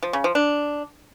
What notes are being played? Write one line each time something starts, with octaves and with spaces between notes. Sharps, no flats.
F3
C#3
F3
D4